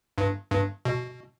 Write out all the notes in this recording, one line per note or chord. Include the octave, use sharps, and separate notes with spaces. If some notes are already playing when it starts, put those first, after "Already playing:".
G2
G2
B2